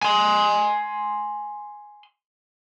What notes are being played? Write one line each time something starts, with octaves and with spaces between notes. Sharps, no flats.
G#5 C6